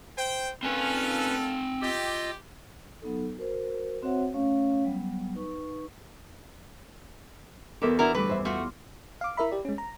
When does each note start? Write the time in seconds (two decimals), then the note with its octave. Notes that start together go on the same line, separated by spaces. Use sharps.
0.17 C5 G5
0.63 A#2 C4 C#4 F4 A4 B4 G#5
1.81 F4 G4 D#5 E6
3.02 F#3 B3 D#4 A4
3.37 F#4 A#4 C5
4.03 C4 F#4 C5 C#5 E5 F#5
4.34 A3 C#4 C#5 F5
4.84 F#3 G3 B3
5.35 D#4 B4 C#6
7.82 E2 G3 F#4 A4 A#4 E5 D6
7.99 D4 E4 F#4 A#4
8.15 D3 G3 A3 B4 D6
8.28 F#2 C5 E5
8.45 E2 A3 F4 F#4
9.21 F5 D6
9.37 E4 A#4 E5 B5
9.52 G4 D5
9.65 G#3 C#4
9.78 A#5